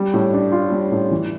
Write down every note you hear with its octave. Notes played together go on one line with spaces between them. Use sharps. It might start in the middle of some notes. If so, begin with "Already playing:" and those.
Already playing: G3
A2
D4
F4
G3
A2
E3